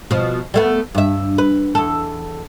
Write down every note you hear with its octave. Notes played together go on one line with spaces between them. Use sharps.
B2 F3
G3 A3 B3
G2 E5
B4
E2 A4